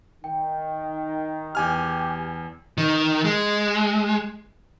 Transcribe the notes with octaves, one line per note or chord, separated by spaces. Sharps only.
D#3 G5
E2 G4 G#5 F6
D#3
G#3